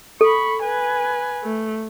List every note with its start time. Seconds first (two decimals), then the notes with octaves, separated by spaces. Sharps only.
0.21 A4 B5 C#6
0.63 B4 G#5
1.43 A3